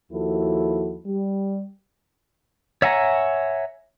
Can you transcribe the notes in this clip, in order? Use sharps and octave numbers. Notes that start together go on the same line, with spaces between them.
D#2 F3 E4 F#4 A4
G3
C#5 E5 F#5 G#5 A#5